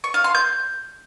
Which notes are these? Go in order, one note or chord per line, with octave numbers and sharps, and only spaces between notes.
C#6
F5
C6
G6